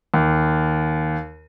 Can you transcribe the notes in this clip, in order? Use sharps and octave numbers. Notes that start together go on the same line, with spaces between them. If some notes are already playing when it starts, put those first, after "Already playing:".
D#2